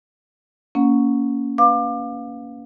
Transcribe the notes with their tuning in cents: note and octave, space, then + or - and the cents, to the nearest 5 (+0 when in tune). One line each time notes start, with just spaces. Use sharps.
A#3 +0 C#4 +15 F#5 -30
B4 +0 F5 +20 D6 +25